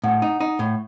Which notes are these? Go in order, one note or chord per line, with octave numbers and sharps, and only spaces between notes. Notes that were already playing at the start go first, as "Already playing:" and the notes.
A2 F#5
D#4
D#4
A2